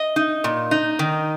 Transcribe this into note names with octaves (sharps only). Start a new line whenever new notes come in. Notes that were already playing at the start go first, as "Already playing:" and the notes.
Already playing: D#5
D#4
A#2
D#4
D#3